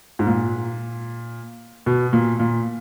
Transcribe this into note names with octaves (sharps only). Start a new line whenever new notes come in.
G#2
A#2
B2
A#2
A#2